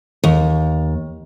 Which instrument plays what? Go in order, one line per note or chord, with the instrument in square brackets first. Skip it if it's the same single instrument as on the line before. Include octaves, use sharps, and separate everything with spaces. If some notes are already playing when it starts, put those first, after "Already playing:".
[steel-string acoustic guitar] D#2